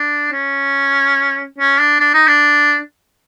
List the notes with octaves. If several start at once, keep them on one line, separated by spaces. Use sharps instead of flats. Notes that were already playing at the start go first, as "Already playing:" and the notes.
Already playing: D4
C#4
C#4
D4
D4
D#4
D4